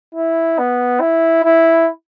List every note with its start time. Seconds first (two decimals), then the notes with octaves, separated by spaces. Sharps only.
0.15 E4
0.58 B3
1.00 E4
1.44 E4